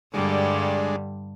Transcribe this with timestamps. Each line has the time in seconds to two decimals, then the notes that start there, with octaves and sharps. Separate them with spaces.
0.14 G2 D3 G3 G#3 D4